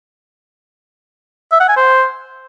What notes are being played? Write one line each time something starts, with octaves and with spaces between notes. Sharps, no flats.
E5
F#5
G#5
C5